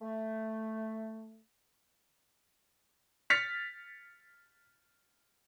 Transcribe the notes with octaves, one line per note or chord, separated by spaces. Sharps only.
A3
F6 A6 B6 C#7 F7